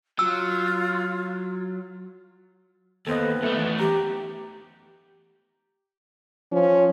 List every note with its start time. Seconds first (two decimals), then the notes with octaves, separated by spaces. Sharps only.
0.19 F#3 F4 E6
3.07 D#2 B3 A4 C5 D#5
3.42 F#2 A3 A4 E5 C#7
3.58 E3
3.79 G4 A#5
6.52 F3 C#4